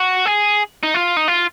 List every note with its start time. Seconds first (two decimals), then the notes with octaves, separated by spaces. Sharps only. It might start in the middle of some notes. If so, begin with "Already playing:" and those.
Already playing: F#4
0.26 G#4
0.83 D#4
0.94 F4
1.17 D#4
1.28 F4